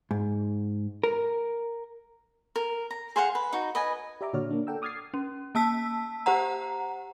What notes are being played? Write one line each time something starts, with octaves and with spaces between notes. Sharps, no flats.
G#2
A#4
A#4
A#5
G#4 C5 F5 F#5
B4
D#4 F#4
B4 D#5 G#5
G4 D5 E5 A#5 D6
A#2 D3 F#4 C#5 D5 F6
A#3 D4
A4 D5 F#5 G5 A#5 E6
D6 D#6 F6 G#6 A6 C7
C#4
A#3 A5 E6 B6
G4 C5 F#5 A#5